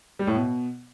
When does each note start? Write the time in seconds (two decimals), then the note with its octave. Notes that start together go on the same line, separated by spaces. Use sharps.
0.19 G3
0.27 A2
0.35 B2